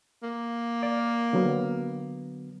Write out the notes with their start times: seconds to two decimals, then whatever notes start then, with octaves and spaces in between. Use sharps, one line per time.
0.23 A#3
0.83 D5
1.33 D3 F#3 B3